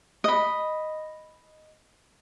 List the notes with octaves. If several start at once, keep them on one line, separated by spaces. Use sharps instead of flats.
D#5 B5